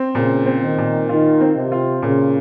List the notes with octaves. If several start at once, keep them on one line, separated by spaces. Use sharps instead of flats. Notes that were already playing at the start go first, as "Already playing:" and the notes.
Already playing: C4
A#2 C#3
C4
D#3
A#2
D#3 F4
C4
C3
F4
A#2 C#3